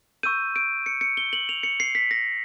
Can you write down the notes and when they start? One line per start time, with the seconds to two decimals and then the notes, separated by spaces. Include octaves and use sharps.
0.23 C#6 E6 G6 D#7
0.56 D7
0.86 C#7
1.01 C#7
1.17 G7
1.33 F#7
1.49 F7
1.63 C#7
1.80 C7
1.95 B6
2.11 A#6